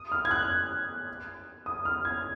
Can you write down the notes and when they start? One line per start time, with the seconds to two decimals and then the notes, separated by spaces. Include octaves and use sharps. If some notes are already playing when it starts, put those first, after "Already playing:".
Already playing: D#6
0.12 F6
0.25 G#6
0.31 F#6
1.66 D#6
1.85 F6
2.05 G#6